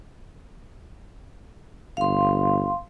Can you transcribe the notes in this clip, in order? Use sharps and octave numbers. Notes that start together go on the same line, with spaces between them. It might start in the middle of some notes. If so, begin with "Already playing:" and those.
G1 F5 C6